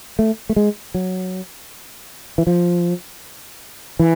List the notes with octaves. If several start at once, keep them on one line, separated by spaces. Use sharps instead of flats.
A3
A3
G#3
F#3
E3
F3
E3